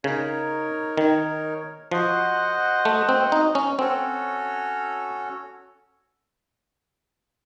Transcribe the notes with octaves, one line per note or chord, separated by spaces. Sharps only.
C#3 D#4 A#4 C#5
D#3
F3 F#4 C5 D#5 F#5
A3
C4
D#4
C#4
C4 C#4 F#4 A4 C#5